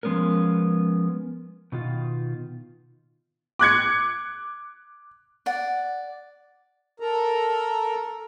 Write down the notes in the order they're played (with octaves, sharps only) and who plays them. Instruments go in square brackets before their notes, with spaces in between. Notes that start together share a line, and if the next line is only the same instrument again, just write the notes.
[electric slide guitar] F3 G#3 B3 C#4 A#4
B2 D#3 F4
[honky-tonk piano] D6 F#6 G#6 C#7
[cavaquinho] D5 F#5
[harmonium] A4 A#4 A#5